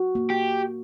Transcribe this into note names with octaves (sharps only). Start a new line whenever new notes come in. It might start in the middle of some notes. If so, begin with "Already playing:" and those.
Already playing: F#4
A#3
G4